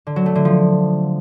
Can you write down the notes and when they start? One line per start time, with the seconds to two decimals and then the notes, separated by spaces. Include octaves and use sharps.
0.07 D3
0.16 F#3
0.26 A3
0.35 D3
0.45 F3